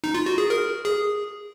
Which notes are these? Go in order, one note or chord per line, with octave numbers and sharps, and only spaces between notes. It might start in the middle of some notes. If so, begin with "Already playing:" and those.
D#4
F4
F#4
G#4
A#4
G#4